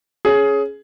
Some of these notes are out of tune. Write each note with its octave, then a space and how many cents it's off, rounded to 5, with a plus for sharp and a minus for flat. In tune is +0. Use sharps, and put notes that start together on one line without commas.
C#4 +0 G#4 +15